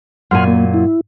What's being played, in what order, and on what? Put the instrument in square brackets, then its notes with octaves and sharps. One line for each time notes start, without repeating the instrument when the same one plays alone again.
[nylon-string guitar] F#2 A#2 G#5 [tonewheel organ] F#5 C6 F6
[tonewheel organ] A#3
E4